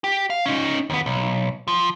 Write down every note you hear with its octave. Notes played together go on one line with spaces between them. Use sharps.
G4
F5
C#4 D#4
D#2 B3
B1
F3